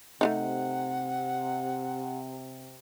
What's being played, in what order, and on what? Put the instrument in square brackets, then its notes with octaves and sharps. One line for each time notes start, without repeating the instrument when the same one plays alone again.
[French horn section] C3 [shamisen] A3 D4 D#4 [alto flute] F#5